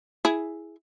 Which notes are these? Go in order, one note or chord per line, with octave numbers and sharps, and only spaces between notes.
E4 G#4